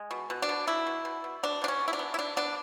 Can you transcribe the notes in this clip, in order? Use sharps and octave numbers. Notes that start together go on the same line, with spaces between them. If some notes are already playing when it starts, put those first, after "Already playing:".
Already playing: G#3
B2
B2
D4
B2
B2 E4
B2
B2
B2
B2 D4
B2 D4
C#4
B2
E4
D4
B3
E4
B2 D4
B3 D4